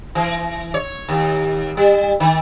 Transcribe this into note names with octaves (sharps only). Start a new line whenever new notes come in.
E3
C#5
D#2
G3
D#3